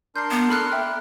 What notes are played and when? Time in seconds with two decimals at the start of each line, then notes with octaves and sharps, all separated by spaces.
0.16 D4 A#4 C6 G6 C7
0.31 B3
0.50 A4 B5 F6 F#6
0.72 E5 G5